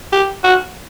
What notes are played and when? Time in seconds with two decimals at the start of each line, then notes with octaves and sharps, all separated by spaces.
0.12 G4
0.44 F#4